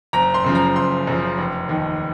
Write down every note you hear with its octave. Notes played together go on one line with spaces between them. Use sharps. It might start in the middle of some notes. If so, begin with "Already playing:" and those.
F#1 A#5
C6
F#2 C#3 F3
A#5
F#1 C6
F#2 C#3 F3
F1
D#2 D#3